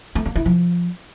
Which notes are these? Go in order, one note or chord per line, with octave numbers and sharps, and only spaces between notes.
A3
A#3
E4
F3